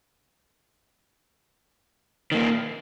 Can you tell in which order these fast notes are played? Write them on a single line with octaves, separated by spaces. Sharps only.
D#3 A#3 A#2